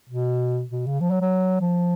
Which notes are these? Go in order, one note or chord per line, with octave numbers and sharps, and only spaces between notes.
B2
B2
C#3
F3
F#3
F#3
F3